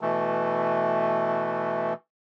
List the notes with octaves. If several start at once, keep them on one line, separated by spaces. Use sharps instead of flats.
B2 E3 A3